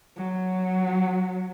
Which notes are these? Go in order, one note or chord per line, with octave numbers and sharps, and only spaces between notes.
F#3